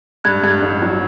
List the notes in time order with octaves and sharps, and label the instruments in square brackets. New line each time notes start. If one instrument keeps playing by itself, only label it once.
[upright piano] G2 [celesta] F#6 G#6
[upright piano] G2
A1
F#3